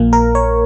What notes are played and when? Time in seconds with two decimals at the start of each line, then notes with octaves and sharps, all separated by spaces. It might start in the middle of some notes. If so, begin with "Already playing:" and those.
Already playing: A#1 A#2 A#3
0.13 A#4
0.35 C#5